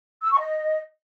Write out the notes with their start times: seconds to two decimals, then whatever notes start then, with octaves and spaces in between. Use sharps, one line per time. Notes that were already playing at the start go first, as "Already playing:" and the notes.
0.23 E6
0.31 C#6
0.39 D#5